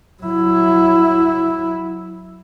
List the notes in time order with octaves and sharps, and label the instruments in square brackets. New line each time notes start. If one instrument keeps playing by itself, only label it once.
[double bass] F#3 E4